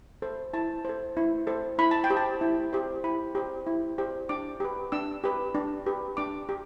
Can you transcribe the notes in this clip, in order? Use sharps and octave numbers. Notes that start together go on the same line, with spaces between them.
A4 C5
E4 A5
A4 C5
E4
A4 C5
E4 B5
A5
G5
G4 C5
A5
E4
G4 C5
E4 B5
G4 C5
E4
G4 C5
D4 D6
G4 B4
D4 E6
G4 B4
D4
G4 B4
D4 D6
G4